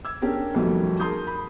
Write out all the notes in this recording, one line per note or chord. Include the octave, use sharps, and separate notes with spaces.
E6 G#6
C#4 D4 G4 G#4 A#4
B1 F2 D#3 F#3 G3 A3
G#4 A#4 A5 C6 D#6 G6
B5